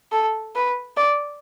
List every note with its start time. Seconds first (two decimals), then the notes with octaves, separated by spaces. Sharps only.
0.12 A4
0.55 B4
0.97 D5